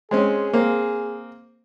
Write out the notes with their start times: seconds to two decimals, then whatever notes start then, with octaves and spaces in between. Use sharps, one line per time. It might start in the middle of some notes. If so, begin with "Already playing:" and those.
0.11 G#3 C4 C#4 G#4
0.54 A#3 C4